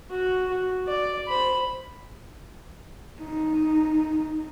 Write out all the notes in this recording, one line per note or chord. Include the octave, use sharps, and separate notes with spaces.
F#4
F#4
D5
C5 B5
D#4